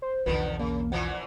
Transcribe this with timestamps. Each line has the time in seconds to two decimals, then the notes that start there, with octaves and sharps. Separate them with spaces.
0.02 C5
0.26 B1 E2 D3 D#3 F3 B4
0.59 C#3 A#3
0.92 A#2 E3 F3 F#5